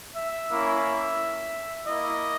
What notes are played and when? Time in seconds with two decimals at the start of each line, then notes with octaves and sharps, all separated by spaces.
0.17 E5
0.50 A#3 C#4 E4
1.85 A#3 E4 D#5